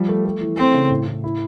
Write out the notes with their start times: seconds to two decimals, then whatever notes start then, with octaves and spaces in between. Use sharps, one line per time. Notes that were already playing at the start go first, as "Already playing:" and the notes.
Already playing: F3 G3
0.09 A3
0.25 A3
0.41 E3
0.57 A3 C4
0.74 C#3
0.90 A2
1.07 A2
1.24 E4